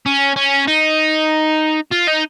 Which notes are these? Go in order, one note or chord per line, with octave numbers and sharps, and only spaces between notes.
C#4
C#4
D#4
F4
D#4